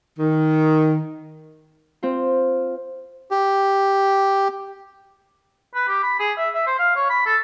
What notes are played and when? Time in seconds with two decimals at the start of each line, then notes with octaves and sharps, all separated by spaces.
0.19 D#3
2.03 C4 F4
3.31 G4
5.75 B4
5.88 G4
6.03 B5
6.19 G#4
6.37 E5
6.54 E5
6.67 C5
6.79 F5
6.96 C#5
7.09 B5
7.26 A4